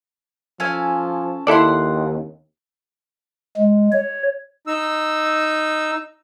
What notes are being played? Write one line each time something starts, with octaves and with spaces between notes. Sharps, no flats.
F3 C#4 A4 G#5
D#2 E4 A4 D5 F#5 C6
G#3
C#5
D#4 E6